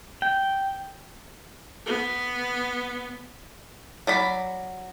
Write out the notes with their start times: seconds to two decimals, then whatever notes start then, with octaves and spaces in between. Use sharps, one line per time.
0.22 G5
1.86 B3
4.07 F#3 D5 B5